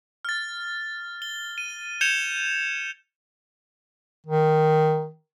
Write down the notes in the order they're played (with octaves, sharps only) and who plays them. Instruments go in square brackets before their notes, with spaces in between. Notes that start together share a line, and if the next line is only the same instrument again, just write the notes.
[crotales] F6 A6
G7
D#7
G6 G#6 C#7 E7 F7 G7
[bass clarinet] D#3